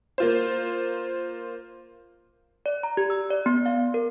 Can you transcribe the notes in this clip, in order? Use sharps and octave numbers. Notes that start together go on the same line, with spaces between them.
A#3 F4 C5
D5
A#5
G4
E6
D5
B3
F5
A#4